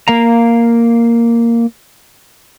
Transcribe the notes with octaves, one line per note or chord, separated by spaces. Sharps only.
A#3 F5 A#5